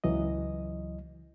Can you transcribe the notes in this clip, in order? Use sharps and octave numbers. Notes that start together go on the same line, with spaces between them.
C#2 E3 F#3 D#5